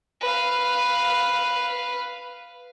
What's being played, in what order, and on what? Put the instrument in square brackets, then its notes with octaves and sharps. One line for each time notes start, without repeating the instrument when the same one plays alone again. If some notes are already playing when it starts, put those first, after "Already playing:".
[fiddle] B4 F5